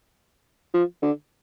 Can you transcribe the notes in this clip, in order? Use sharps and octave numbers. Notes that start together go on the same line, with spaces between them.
F3
D3